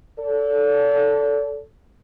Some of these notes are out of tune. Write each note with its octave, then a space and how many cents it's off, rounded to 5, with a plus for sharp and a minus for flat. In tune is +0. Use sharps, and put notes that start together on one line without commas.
A4 +0 D5 -40